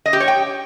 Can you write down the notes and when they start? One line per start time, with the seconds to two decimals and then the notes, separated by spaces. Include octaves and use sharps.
0.06 D#5
0.13 G4
0.20 C#5
0.28 G5